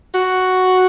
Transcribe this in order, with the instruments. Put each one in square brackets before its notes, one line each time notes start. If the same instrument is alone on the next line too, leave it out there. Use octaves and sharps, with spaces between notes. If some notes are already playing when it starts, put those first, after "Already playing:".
[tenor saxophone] F#4